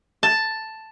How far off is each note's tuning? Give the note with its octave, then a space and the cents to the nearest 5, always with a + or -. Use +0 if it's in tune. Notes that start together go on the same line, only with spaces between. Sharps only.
A5 +5